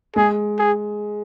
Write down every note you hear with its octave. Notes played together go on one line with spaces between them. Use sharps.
G#3 G#4
G#4